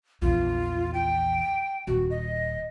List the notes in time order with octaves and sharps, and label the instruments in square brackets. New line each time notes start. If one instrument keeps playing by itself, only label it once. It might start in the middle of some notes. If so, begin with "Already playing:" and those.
[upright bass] A#1 E2 [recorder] F4
[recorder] G5
[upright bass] D#1 [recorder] F#4
[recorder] D#5